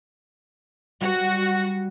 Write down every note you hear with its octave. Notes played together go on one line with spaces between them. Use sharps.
G3 F#4